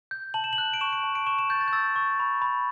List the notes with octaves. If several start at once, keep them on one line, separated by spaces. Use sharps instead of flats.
G6
A5 F#7
E7
F#7
F#6
D7
C#6 E7
D7
A5
D7
C#6 E7
E7
G6 A6
A6
G6
E6 A6
C#6
B5
B5